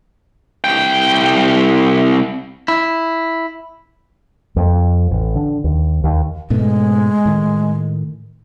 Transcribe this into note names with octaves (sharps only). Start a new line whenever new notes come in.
C2 G5
E4
F2
A1
D3
D#2
D#2
G#2 B2 G#3 A3
A2 D#3